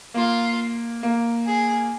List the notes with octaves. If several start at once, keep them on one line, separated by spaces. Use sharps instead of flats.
A#3 F4
A#3
G#4